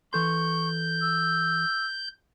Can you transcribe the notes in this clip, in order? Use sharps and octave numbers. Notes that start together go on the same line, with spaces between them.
E3 A4 C6 C#6 G6
E6